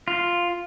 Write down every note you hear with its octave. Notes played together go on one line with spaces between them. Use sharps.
F4